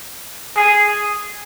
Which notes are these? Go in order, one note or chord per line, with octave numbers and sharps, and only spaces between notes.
G#4